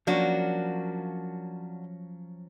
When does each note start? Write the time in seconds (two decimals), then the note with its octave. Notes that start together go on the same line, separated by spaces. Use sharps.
0.07 F3 F#3 A#3 C#4 D4 F#4